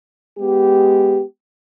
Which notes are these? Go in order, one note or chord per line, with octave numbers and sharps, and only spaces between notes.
G#3 B3 G4